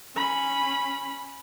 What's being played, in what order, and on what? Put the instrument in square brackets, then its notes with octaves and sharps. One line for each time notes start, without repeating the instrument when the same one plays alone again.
[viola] C#4 B5